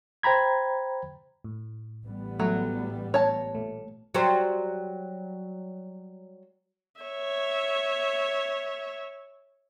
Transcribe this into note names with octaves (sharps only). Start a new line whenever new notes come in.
C5 G5 A#5 B5 G#6
A2
A1 G3 B3
F#3 A3
C#5 A5 A#5
A#2 A3
F#3 G3 C5
C#5 E5